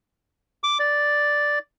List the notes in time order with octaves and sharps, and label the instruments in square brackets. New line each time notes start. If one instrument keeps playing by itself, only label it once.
[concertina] D6
D5